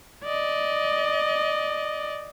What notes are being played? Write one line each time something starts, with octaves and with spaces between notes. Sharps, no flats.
D5 D#5